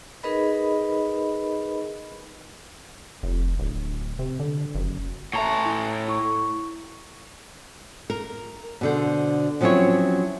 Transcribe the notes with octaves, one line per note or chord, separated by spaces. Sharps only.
D#4 G#4 A#4 B4 D#5 B5
F1
D1
C3
D3
F#1
A2 E5 A5 A#5 C#6
E4
E4 C#6
A#4
B2 D3 C5
F3 F#3 C4 C#4 E4 C#5